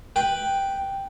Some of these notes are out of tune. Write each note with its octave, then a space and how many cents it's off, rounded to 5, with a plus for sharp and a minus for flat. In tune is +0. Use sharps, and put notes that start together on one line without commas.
B4 +0 G5 +0